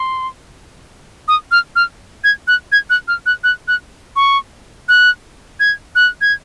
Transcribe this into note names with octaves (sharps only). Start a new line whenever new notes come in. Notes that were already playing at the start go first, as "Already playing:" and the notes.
Already playing: C6
D#6
F6
F6
G#6
F#6
G#6
F#6
F6
F#6
F#6
F#6
C#6
F#6
G#6
F#6
G#6